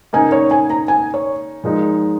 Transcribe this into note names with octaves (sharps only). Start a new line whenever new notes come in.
C#3 A#3 D#4 G#5
C#5
G#5
A#5
G#5
C#5
A#2 F3 G#3 D#4